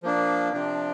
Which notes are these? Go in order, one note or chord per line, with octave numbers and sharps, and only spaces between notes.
F3 A#3 D4
C3 F3 D4